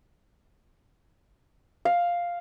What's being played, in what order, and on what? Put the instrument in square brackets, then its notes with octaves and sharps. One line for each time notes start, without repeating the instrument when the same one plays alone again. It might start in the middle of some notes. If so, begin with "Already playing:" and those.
[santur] F5